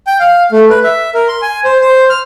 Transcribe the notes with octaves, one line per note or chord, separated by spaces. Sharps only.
G5
F5
A3
B4
E5
A#4
C6
G#5
C5
C5
F6